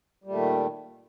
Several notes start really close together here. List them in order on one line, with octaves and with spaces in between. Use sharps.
G3 A#2 A3 D#3